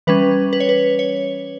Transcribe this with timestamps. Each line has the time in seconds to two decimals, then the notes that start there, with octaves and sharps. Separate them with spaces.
0.07 E3 G3 C#4 B4
0.53 B4
0.60 C#5
0.69 B4
0.99 C#5